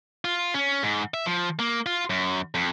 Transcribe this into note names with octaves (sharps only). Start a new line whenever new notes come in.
F4
C#4
G#2
E5
F3
A#3
F4
F#2
F2